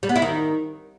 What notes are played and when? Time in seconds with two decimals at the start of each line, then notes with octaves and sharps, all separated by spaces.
0.03 G3
0.09 B3
0.16 E4
0.22 D#3